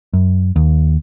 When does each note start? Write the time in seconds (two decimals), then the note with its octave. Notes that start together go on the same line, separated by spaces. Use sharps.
0.13 F#2
0.56 D#2